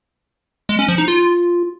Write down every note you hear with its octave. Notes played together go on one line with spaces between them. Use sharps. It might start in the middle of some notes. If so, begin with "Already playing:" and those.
G#3
C#4
F3
D#4
F4